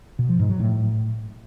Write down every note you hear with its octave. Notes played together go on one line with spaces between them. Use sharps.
B2
F3
G#2
F#3
A2